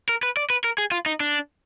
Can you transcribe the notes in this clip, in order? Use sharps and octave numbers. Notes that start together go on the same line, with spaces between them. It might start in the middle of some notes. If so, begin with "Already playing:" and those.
A#4
B4
D5
B4
A#4
G#4
F4
D#4
D4